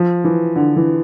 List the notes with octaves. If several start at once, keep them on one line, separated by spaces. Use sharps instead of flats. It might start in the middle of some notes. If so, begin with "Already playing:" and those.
Already playing: F3
E3
D3
E3